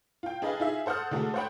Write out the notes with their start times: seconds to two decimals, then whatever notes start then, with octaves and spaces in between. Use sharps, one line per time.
0.23 F4 G5
0.42 D4 G#4 B4 D#5 F5
0.60 D#4 F4 G#4 E5 F5
0.86 A4 C5 F#5 D#6 F6
1.11 D3 G#3 A3 D4 F#4 A4
1.34 C5 C#5 F#5 G5 B5